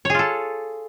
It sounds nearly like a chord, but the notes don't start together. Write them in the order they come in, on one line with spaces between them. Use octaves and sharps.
C#5 G#4 F4 A4